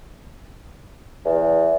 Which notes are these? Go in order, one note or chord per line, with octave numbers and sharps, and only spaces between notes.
E2